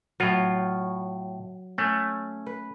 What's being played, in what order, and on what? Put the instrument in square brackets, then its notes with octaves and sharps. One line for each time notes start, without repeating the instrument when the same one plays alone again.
[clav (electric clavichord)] A2 F4 [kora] F#3
[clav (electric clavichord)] A3 [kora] C#4
[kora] B4